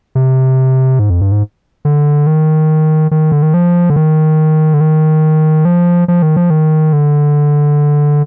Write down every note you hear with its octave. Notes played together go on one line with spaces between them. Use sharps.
C3
G#2
F2
G2
G#2
D3
D#3
D#3
D3
D#3
F3
D3
D#3
D3
D#3
F3
F3
D#3
F3
D#3
D3